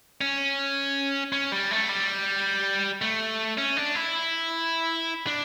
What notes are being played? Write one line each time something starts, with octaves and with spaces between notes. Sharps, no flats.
C#4
C#4
G3
A3
G3
A3
C#4
D4
E4
D4